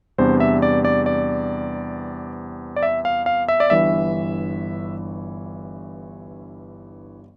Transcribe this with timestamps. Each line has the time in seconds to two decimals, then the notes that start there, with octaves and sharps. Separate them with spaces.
0.18 E2 C3 G3 B3 D4 C5
0.40 E5
0.62 D5
0.85 D5
1.06 D5
2.76 D5
2.83 E5
3.05 F5
3.26 F5
3.48 E5
3.60 D5
3.70 G1 G2 E3 E5